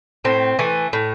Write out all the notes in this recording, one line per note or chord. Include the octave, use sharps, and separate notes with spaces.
A2 C4
E3 A3
A2